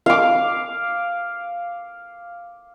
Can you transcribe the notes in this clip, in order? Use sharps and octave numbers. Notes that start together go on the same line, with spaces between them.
F5 D6